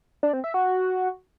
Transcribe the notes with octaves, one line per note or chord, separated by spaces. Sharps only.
D4
C4
E5
F#4